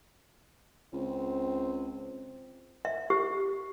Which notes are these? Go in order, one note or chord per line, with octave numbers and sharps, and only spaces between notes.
C#2 C4
E5
G4